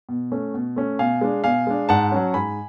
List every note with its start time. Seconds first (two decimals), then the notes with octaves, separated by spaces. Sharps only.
0.09 B2
0.32 A3 C#4
0.54 B2
0.76 A3 C#4
0.99 B2 F5 G#5
1.21 G#3 D4
1.44 B2 F5 G#5
1.67 G#3 D4
1.89 G#2 F#5 A5
2.12 F#3 C#4
2.34 G#2 G#5 B5